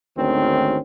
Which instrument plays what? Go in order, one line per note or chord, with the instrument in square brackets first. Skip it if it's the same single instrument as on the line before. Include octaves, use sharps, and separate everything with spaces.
[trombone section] G#1 D2 D#3 C4 C#4